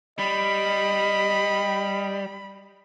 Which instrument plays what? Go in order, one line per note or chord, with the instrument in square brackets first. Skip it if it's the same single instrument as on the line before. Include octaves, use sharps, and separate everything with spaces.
[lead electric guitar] G3 [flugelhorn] D#5 [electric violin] B5